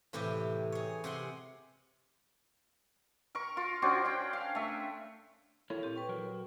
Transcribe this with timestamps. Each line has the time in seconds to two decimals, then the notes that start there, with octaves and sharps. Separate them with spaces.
0.13 A2 C3 E3 E4 G4
0.72 G#4 C#5
1.04 C3 G#4 F#5 C6
3.35 A#4 C#6
3.57 F4
3.82 C#4 D4 F#4 C5
4.05 F#5 G5
4.33 F5
4.55 A3 E5
5.70 E4 A4 A#4 C#5
5.83 A#2 C4 G4
5.96 B4 G5 C#6
6.09 F#3 A#4